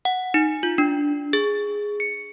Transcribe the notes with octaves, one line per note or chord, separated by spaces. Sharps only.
F#5
D#4
F4
D4
G#4
C#7